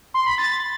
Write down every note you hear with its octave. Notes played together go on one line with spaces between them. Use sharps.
C6
B5
A6